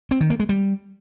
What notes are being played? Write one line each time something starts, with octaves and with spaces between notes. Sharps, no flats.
C4
D#3
A#3
G#3
G3